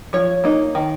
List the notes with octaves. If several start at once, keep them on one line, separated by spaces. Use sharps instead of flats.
F3 C#5
A#3 D#4
D#3